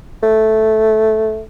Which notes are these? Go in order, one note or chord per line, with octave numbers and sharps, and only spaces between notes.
A3